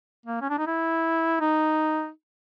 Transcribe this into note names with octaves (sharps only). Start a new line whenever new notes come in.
A#3
C#4
D4
D#4
E4
D#4